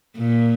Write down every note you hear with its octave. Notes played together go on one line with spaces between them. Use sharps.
A#2